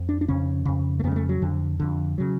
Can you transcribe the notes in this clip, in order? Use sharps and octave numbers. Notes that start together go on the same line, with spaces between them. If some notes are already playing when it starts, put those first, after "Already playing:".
Already playing: F2
D4
D4
F2 C#3 C#4
F2 C#3
A3
F2 C#3 G#3 B3
A3
F#3
F2 D3
F2 D3
C#3 F#3